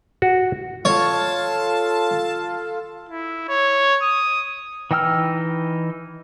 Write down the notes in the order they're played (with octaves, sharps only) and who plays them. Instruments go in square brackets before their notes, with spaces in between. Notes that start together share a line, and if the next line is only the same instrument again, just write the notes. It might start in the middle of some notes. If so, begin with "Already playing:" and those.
[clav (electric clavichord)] F#4
[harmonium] F4 A4 F5 [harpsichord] C#5 [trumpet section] A5
[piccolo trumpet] E4
C#5
D#6
[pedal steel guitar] E3 D#4 G5 E6 F6